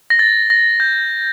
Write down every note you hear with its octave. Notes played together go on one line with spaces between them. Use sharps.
A#6
A6
A#6
G6